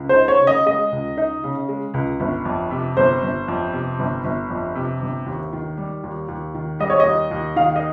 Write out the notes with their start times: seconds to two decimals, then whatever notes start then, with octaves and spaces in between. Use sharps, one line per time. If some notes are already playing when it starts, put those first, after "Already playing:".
Already playing: C#2
0.09 C5
0.16 D#4
0.28 C#5
0.41 C#3
0.47 D#5
0.66 G#3 D#5
0.92 C#2
1.17 D#4
1.44 C#3
1.68 G#3
1.94 C#2
2.20 G1
2.45 F2
2.71 C3
2.97 G1 C5
3.22 G1
3.48 F2
3.73 C3
3.99 G1
4.24 G1
4.50 F2
4.75 C3
5.01 G1
5.26 D#2
5.53 D#3
5.77 G3
6.04 D#2
6.28 D#2
6.54 D#3
6.79 G3 D#5
6.90 C#5
7.00 D#5
7.05 D#2
7.31 D#2
7.56 D#3 F5
7.76 D#5